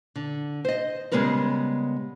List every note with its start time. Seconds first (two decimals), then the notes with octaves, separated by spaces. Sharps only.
0.15 D3
0.65 C5 D#5
1.12 C#3 G3 G#3 B3 A#4 B4